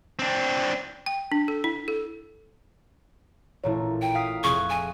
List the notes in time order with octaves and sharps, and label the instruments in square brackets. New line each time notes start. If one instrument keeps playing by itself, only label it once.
[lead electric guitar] C4 D4
[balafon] G5
D4
A4
E4
A4
[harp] A1 A#2 A3 [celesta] E4 C#5
[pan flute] G5
[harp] F5 D#6 B6
[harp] F1 G#4 F#6 [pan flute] C#6
[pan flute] G#5